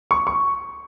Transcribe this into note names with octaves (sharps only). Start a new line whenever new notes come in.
C#6
C#6